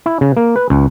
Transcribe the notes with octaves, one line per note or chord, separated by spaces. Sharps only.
E4
C#3
A#3
B4
C#2